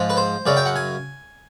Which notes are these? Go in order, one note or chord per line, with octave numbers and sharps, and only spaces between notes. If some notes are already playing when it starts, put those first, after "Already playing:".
Already playing: G#2 F3 G#3
B4
C5
F#2 C#3 F#3 D5
G5
F#5
G#5